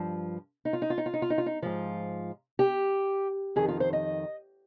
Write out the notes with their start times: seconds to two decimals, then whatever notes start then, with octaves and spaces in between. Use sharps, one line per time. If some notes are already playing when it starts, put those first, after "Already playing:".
Already playing: G2 F3
0.65 D#4
0.73 F4
0.82 D#4
0.90 F4
0.98 D#4
1.06 F4
1.13 D#4
1.22 F4
1.30 D#4
1.38 F4
1.46 D#4
1.62 G#2 F3 F4
2.59 G4
3.56 F2 D#3 G#4
3.68 F4
3.80 C5
3.93 D#5